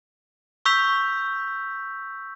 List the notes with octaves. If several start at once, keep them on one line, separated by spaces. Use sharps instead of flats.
C#6 E6 G6 B6 F7